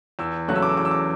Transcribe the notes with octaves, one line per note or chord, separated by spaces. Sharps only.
E2 E6
C#3 F#3 A3 C#4 F#6
E6
D6
E6
E2 D6
E6
D6